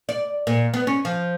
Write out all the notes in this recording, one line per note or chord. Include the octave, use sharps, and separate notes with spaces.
D5
A#2
B3
C#4
F3